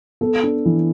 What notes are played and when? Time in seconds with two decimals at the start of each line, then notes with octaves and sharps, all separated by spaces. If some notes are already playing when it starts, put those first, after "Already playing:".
0.21 B3 A4
0.43 D4
0.65 E3